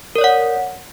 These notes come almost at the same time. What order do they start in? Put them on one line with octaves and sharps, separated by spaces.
A#4 D5 C#5 F#5